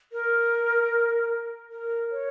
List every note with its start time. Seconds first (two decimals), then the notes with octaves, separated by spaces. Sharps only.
0.12 A#4
1.72 A#4
2.11 C#5